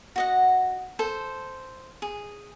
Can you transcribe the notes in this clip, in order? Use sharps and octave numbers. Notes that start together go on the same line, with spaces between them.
F#4 D#5 F#5
A4 C5
G#4